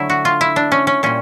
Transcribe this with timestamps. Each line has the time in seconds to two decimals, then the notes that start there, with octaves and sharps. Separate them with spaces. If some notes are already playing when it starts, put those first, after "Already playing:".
Already playing: D3 F#3 A3 E4
0.10 F#4
0.25 F4
0.41 E4
0.56 D4
0.72 C#4
0.87 C#4
1.03 A#2 G3 C#4